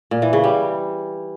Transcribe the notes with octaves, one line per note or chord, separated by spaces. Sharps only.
A#2
E3
C#3
G3